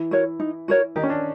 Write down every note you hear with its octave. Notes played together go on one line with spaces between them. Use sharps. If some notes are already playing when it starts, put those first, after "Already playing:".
Already playing: E3 E4
F#4 A#4 C#5
D#4
F#4 A#4 C#5
D#3 D#4 G4
C#4
D4